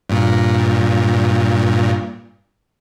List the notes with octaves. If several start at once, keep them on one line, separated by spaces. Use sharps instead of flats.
G2 A#2